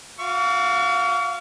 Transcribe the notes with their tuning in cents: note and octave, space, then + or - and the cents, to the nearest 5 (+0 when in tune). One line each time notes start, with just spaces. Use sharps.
F#4 -40 F5 -15 C#6 +45